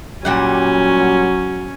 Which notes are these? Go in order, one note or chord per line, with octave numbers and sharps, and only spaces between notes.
A#2 F#3 G3 C#4 F#5